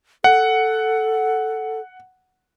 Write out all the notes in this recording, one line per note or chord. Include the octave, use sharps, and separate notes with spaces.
A4 F#5